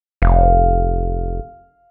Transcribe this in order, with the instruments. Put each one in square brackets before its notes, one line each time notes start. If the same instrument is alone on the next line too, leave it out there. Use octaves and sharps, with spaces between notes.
[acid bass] F1 [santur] F5